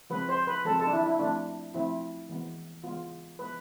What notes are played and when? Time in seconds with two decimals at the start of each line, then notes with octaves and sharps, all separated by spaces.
0.10 F3 G#3 C4 B4
0.29 C5
0.47 B4
0.65 F3 G#3 C4 A4
0.79 A4
0.87 D4
0.93 E4
1.06 E4
1.19 F3 A3 C4 D4
1.74 F3 A3 C4 E4
2.29 E3 G#3 B3
2.84 E3 G#3 B3 F4
3.39 F3 G#3 B3 B4